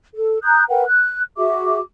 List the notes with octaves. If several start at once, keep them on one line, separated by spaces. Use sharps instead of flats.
A4
A#5 D#6 F#6 G6
A#4 B4 F#5 G5
F#6
F#4 G#4 E5 D6